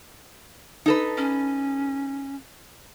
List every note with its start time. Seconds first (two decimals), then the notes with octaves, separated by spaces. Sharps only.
0.86 D#4 A4 B4
1.17 C#4